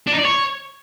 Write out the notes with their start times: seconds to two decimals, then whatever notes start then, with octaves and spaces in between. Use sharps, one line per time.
0.07 D4
0.13 D#4
0.19 D5
0.25 C#5